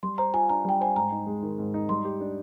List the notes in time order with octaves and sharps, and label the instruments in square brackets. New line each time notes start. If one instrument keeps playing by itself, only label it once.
[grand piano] G3 [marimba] C6
[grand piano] C5 [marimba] A#5
[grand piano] F4 [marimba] G#5
[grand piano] D4 [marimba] A#5
[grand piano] G3 [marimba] G5
[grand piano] C5 [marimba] G#5
[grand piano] G#2 [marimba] A#5
[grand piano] D#4
G#3
D#3
G#2
D#4
[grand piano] G3 [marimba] C6
[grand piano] G4
D4